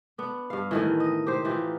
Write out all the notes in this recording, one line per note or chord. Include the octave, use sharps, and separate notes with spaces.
B3 D4
G2 F5
A2 D#3 E3
D#5
G4 C5
E3 D#4 F4 G4